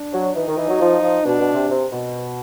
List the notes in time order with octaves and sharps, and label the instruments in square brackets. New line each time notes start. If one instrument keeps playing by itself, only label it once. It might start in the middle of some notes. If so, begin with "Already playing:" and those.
Already playing: [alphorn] D4
[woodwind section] F#3
[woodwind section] E3 [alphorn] D#4
[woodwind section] D#3
E3
F#3
F3
F3
[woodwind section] B2 [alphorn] D4
[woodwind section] B2
C3
C3
B2